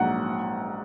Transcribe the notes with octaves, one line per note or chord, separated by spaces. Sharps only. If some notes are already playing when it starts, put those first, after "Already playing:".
Already playing: A#1 G#2 F#3 F#5